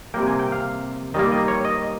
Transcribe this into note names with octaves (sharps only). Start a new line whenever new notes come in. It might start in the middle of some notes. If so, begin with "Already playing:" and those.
C3 G3 A#3 G5
G#5
G5
F5
D#3 G3 A#3 D#5
D#5
C#5
D#5